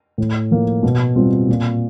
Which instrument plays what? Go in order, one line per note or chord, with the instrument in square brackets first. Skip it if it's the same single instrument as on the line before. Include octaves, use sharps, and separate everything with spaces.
[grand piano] A2
F3 A#3
B2
G3 C4 F4
A#2